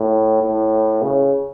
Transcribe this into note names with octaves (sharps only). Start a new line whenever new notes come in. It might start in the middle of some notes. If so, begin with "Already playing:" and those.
Already playing: A2
A2
C#3